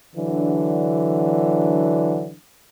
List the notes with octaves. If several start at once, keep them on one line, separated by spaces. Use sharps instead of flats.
D3 E3 F#3 D4